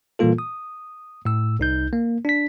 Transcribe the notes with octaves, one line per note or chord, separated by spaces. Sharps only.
A#2 E3 G3 A#3 F4 A4
D#6
A2 E6
C2 D#4 G6
A#3
D4 B6